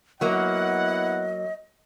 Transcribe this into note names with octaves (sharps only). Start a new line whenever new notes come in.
F#3 A#3 B3 E4 D#5 F#5